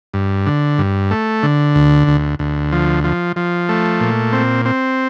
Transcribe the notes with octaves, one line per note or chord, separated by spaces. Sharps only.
G2
D3
G2
A3
D3
D2
D2
D2
F3
F3
F3
A3
A#2
C4
C4